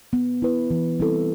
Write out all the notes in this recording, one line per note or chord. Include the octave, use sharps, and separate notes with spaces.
B3
E4 B4
E3
G3 C4 E4 A4